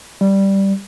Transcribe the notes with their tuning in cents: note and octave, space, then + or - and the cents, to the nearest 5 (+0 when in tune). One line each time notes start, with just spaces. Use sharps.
G3 -5